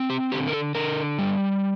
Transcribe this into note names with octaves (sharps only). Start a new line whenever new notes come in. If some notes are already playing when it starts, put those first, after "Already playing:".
Already playing: C4
G4
D3 G4
A#4
A4
D3 A#4
G3